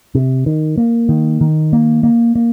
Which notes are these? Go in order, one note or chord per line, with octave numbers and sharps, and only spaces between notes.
C3
D#3
A#3
D#3
D#3
A#3
A#3
A#3